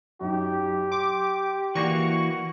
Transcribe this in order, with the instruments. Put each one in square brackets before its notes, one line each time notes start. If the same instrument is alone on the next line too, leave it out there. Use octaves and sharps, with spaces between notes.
[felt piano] F#2 D#4 [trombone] G4
[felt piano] C6 [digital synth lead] D6
[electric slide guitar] E3 A#3 F#4 [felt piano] D5 A#6 C7 [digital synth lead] C#6